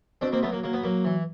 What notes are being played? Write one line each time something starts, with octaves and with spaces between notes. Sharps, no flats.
B2 C4 D4
A#3 C4
F#3 A3 B3
A#3
F#3 A#3
B3
F#3 A#3
E3